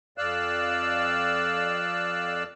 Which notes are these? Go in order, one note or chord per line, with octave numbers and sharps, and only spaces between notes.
F2 D5 F5 E6 F#6